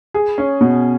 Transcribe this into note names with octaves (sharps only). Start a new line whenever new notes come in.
G#4
C#4
B2